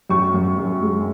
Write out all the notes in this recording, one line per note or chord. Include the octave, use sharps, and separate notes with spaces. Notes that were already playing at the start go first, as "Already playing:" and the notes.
F#2 C#6
F#2
F#2
G#3